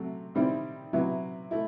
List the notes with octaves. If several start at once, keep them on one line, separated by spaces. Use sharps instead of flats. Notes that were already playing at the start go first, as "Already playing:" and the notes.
Already playing: C3 F#3 A3
C3 D#3 G3 C4 E4
C3 F#3 B3 E4
A3 E4